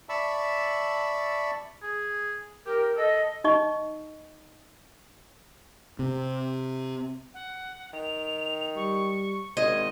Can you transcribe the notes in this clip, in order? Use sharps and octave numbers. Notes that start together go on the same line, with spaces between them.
D5 E5 A5 B5 C#6 E6
G#4
G4 A#4
A4 D#5
D#4 D#5 C#6
C3
F#5
D#3 F7
G3 C#6
G#1 C5 D#5 G#6